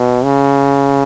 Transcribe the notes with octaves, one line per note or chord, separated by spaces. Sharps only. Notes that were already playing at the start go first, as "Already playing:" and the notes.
Already playing: B2
C#3